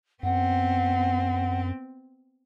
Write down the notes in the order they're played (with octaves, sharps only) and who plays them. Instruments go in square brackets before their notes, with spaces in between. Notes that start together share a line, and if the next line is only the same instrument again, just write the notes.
[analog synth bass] F#2 [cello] B3 C4 [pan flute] F#5